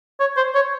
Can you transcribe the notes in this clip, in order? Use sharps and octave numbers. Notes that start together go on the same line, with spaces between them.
C#5
C5
C#5